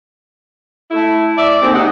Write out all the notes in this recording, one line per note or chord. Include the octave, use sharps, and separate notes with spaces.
A3 E4
D5 E5
D#2 D3 C4
G#2 D4 D#5 F#5